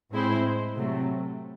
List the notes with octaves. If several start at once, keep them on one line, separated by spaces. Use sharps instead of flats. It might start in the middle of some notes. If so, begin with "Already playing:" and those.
A2 G#3 C4 E4 C5
C3 F#3 A3